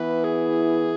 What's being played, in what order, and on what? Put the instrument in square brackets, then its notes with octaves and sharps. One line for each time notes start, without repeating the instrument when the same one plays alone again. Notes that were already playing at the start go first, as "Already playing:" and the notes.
Already playing: [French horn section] E3 B3 E4 [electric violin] B4
[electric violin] G#4